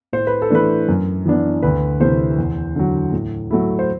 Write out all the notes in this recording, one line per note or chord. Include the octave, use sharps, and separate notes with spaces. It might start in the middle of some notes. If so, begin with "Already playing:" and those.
A2 C5
B4
A4
E3 A3 D4 B4
F#2
E3 B3 D4
D2 B4
C3 E3 A3 C5
E2
D3 F#3
A2
F#3 A3 E4
C5